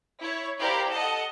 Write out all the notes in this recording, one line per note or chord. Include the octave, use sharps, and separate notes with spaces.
E4 C#5
E4 G4 A#4 C5 D5 F5
A4 D#5 F#5